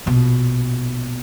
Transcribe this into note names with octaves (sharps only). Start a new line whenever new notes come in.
A#1 B2